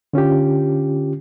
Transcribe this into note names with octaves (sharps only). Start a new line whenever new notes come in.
D3 C#4 F4 G4